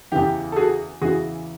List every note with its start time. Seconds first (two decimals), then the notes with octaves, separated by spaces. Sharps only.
0.12 E2 C#3 E3 G4
0.52 A4
0.56 F#4 G#4
1.02 E2 C#3 E3 F#4 G#4